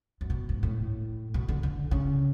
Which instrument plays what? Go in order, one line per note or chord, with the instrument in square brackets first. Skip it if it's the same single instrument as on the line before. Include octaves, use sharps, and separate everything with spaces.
[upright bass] F#2
B2
G#2
A2
B2
D3
D3
C#3